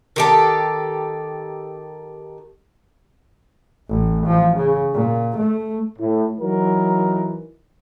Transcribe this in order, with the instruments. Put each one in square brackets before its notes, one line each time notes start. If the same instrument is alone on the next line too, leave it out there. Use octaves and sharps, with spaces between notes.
[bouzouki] D#3 G4 A4
[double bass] A1
F3
C#3
A#2
A3
[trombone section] A2
E3 F#3 D#4 A#4